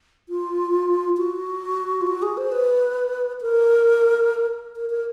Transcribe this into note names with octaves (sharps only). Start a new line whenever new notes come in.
F4
F#4
F4
F#4
G#4
C5
B4
A#4
A#4
A#4